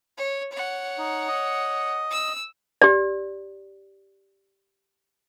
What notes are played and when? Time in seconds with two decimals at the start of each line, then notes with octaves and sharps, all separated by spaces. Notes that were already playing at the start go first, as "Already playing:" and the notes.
0.18 C#5
0.52 C#5 F#5
0.98 D#4
1.28 D#5
2.11 E6
2.82 G4 D5